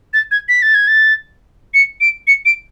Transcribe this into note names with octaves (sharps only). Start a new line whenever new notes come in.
A6
G#6
B6
A6
G#6
A6
C#7
D7
C#7
D7